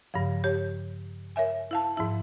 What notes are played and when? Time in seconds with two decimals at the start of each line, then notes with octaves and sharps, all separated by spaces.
0.14 G2 C#3 F3
0.44 G4 C#5
1.36 A#4 C#5 E5 G#5
1.71 E4 F5 A5
1.96 G#2 F3 E4 E5